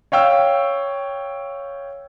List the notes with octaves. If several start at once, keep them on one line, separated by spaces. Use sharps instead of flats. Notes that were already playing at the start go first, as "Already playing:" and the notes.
C#5 F5 G5 E6